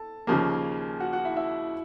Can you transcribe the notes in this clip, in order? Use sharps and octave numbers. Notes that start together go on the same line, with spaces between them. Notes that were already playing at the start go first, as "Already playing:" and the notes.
Already playing: A4 A5
D#2 C#3 F3 A#3 G#4 G#5
F#4 F#5
F#4 F#5
E4 E5
E4 E5